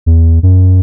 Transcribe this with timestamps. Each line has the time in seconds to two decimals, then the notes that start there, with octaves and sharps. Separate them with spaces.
0.06 E2
0.43 F#2